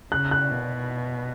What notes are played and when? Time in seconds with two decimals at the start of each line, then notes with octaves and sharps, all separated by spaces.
0.12 C#3 F#6
0.31 F#6
0.51 B2